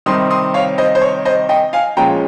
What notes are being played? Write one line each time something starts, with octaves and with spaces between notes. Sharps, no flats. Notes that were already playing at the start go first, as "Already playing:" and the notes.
C3 D#3 G3 C4 C6 D#6
C6 D#6
C#5 F5
C5 D#5
C5
C#5
C5 D#5
D#5 G5
F5 G#5
A#2 F3 G#3 C#4 G5 A#5